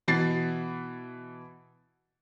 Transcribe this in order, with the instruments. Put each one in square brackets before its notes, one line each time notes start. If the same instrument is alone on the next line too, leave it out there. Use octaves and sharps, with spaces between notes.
[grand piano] B2 E3 F#4 A6 C7